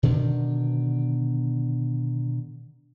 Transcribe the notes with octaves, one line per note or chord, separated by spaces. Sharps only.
B2 D3 D#3